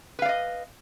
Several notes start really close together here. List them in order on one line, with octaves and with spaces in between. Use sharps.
B4 F5 D5 D#5